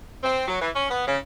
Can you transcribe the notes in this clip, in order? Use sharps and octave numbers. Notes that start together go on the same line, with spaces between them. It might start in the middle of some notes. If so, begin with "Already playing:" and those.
C4
F#3
E3
C#4
B3
C#3